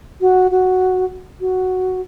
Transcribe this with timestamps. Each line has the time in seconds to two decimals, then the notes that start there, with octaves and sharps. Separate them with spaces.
0.21 F#4
0.51 F#4
1.41 F#4